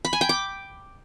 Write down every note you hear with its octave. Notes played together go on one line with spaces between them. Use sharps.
B5
G#5
G5
D6